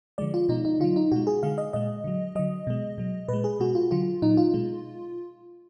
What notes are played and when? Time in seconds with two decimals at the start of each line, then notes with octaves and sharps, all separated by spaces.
0.18 D3 F3 G#3 D5
0.34 F4
0.49 B2 G#3 D#4
0.65 D#4
0.80 D3 F#3 F4
0.96 D#4
1.12 B2 G#3 F#4
1.27 G#4
1.43 D3 G#3 F5
1.58 D#5
1.73 A#2 G#3 D#5
2.04 D3 F#3
2.35 D3 F#3 D#5
2.67 B2 G#3
2.98 B2 F#3
3.28 A#2 G#3 B4
3.44 G#4
3.60 B2 G#3 F#4
3.75 F4
3.91 D3 F#3 F4
4.22 A#2 F#3 D#4
4.37 F4
4.54 B2 G#3